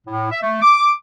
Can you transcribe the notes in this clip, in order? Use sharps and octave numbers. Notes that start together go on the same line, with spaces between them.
A2
E5
A3
D6